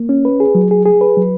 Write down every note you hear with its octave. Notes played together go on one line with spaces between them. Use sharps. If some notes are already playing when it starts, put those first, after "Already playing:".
Already playing: A#3
C#4
B4
G#4
F#3
G#4
G#4
B4
F#3